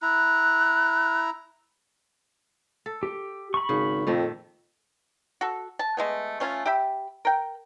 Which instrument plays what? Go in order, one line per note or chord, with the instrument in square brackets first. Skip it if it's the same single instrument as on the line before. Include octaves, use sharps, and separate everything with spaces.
[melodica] E4 A#5 [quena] F#6
[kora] A4
[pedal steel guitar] G4
B5 C#6
[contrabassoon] G#1 [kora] C#3
[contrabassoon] F2 [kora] A#2 D#3 A3
[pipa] F#4 A4
A5
G#3 A3 B3
A3 C#4 F4 G#5
G4 E5 G5 B5
A#4 G5